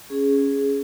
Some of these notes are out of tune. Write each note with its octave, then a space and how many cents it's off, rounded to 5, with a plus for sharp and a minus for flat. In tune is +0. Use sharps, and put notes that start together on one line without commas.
C#4 +0 G#4 +0